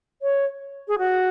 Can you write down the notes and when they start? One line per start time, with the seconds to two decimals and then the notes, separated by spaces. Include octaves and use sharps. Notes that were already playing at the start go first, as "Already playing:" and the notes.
0.22 C#5
0.88 G#4
0.98 F#4